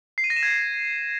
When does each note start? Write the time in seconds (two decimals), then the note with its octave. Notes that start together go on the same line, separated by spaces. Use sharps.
0.18 C7
0.24 D#7
0.30 A#6
0.36 E7
0.43 G#6